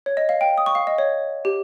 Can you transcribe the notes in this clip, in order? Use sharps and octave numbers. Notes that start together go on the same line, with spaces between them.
C#5
D#5
F5
G5
D#6
C#6
F5
D#5
C#5
G4